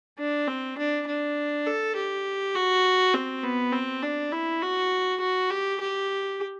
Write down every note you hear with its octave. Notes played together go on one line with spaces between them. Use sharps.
D4
C4
D4
D4
A4
G4
F#4
C4
B3
C4
D4
E4
F#4
F#4
G4
G4